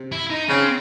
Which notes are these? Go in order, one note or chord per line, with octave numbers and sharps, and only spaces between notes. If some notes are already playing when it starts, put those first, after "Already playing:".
Already playing: C3
E4
D#4
C#3 C4